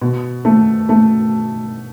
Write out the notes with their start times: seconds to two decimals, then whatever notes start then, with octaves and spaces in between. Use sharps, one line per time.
0.02 B2
0.45 A3
0.89 A3